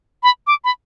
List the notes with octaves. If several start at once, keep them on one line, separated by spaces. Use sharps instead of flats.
B5
D6
B5